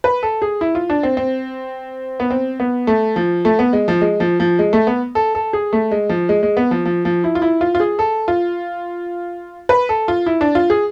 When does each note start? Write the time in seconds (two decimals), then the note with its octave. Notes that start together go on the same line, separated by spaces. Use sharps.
0.04 B4
0.23 A4
0.42 G#4
0.61 E4
0.75 F4
0.90 D4
1.03 C4
1.17 C4
2.20 B3
2.30 C4
2.60 B3
2.87 A3
3.16 F3
3.45 A3
3.59 B3
3.73 G#3
3.88 F3
4.01 G#3
4.20 F3
4.40 F3
4.59 G#3
4.73 A3
4.87 B3
5.15 A4
5.35 A4
5.53 G#4
5.73 A3
5.91 G#3
6.09 F3
6.29 G#3
6.43 G#3
6.57 B3
6.71 F3
6.85 F3
7.05 F3
7.24 E4
7.35 F4
7.42 E4
7.61 F4
7.75 F4
7.80 G#4
7.99 A4
8.28 F4
9.69 B4
9.89 A4
10.08 F4
10.26 E4
10.41 D4
10.55 F4
10.70 G#4